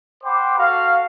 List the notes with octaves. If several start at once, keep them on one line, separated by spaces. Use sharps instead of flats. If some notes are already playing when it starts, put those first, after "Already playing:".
C5 F#5 G5 B5 D6
F#4 A4 F5